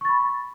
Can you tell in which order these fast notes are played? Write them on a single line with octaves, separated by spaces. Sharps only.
C#6 A6 B5